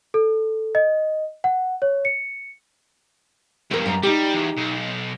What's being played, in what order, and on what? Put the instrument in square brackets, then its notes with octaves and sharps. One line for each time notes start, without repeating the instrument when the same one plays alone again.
[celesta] A4
D#5
F#5
C#5
C#7
[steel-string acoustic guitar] E2 A#4 [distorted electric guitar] G2
[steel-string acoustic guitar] F#2 A#5
[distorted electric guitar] G3 [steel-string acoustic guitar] D#4 G4
[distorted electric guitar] E2
B1